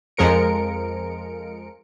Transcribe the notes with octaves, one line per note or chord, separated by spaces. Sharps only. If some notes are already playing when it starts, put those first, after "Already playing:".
F2 F3 G#3 A#4 C#7 D7